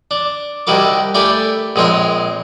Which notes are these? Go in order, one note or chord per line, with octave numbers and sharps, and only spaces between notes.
D4
C2 D#3 E4 F#4 A#4 D6
A3 D4 E4 G4 A#4 G#5
A#1 G#3 C4 A#4 C#5